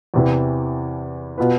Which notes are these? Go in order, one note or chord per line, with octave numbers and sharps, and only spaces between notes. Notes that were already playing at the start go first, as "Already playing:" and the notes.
E2 C3 E3
B2 B3 F4 B4